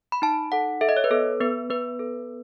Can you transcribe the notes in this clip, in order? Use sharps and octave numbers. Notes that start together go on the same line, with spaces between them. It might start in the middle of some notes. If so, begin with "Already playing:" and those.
B5
D#4 A5
A4 F#5
A4 E5
D#5
C#5
B4
B3 A4
B3 B4
B3 B4
A4